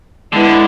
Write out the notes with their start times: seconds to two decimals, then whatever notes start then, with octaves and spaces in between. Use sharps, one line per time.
0.33 D3 G#3 B3 E4